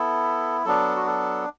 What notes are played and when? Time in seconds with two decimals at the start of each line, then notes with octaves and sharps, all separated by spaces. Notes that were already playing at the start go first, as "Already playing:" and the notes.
Already playing: B3 E4 A4
0.65 F#3 B3 D4 A4
0.96 F#4
1.07 A4